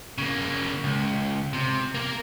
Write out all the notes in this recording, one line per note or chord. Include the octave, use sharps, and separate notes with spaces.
C#3 A#3
C#2
C3
A#3 A#4